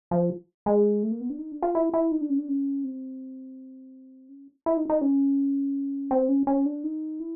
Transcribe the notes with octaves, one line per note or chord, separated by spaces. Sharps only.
F3
G#3
A3
A#3
B3
D4
D#4
D4
F4
E4
E4
D#4
D4
C#4
D4
C#4
C4
C#4
E4
D#4
D#4
C#4
C4
C#4
C#4
D4
D#4
E4